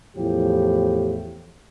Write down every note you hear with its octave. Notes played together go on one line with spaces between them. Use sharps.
E2 A2 F3 G4